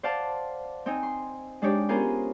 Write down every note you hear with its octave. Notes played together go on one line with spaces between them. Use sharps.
C5 D5 F5 F#5 A5
C4 D#4 G#5
C6
G#3 D4 D#4 G4 C#5 D5
B3 C#4 F4 G#4 A#4 C5